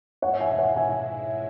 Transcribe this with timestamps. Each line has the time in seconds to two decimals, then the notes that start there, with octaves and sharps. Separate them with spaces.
0.22 G#2 G#3 E4 C#5 F#5
0.41 E5 G#5
0.51 G#5
0.59 C#5 F#5
0.76 E5 G#5